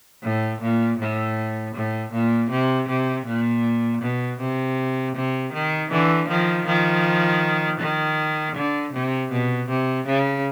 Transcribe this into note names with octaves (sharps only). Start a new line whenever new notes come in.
A2
A#2
A2
A2
A#2
C3
C3
A#2
B2
C3
C3
D#3
D3 E3
D#3 F3
D#3 F3
D#3
D3
C3
B2
C3
C#3